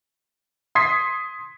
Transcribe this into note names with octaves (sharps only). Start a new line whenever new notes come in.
C6 D#6 G#6 B6 C7